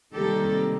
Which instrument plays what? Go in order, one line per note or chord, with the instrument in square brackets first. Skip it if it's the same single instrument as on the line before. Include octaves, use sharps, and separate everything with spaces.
[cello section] C3 D#3 G3 A#3 G4 A4